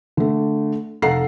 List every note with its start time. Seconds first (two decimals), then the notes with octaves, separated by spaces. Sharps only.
0.17 D3 A3
1.02 F1 A4 F5 F#5 A#5 C7